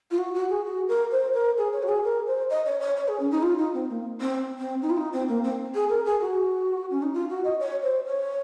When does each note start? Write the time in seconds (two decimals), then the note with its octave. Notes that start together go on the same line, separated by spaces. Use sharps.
0.11 F4
0.18 F#4
0.35 F#4
0.49 G#4
0.65 F#4
0.88 A#4
1.11 C5
1.34 A#4
1.58 G#4
1.73 C#5
1.83 F#4
1.89 G#4
2.04 A#4
2.27 C5
2.50 D#5
2.66 C#5
2.81 C#5
2.97 C#5
3.08 G#4
3.20 C#4
3.31 D#4
3.43 F4
3.58 D#4
3.74 C4
3.90 A#3
4.21 C4
4.59 C4
4.82 D#4
4.90 F4
4.98 D#4
5.13 C4
5.28 A#3
5.44 C4
5.75 G#4
5.90 A#4
6.05 G#4
6.21 F#4
6.91 C#4
7.03 D#4
7.14 F4
7.30 F#4
7.44 D#5
7.60 C#5
7.83 C5
8.06 C#5